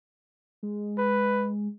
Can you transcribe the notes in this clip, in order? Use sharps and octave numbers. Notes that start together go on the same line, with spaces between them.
G#3
B4